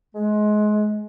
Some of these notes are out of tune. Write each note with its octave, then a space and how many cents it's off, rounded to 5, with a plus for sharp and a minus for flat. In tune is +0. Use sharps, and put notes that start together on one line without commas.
G#3 +25